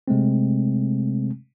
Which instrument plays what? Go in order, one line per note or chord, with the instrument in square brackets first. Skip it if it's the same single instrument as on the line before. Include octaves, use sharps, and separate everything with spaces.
[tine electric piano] C3 G#3 A3 C4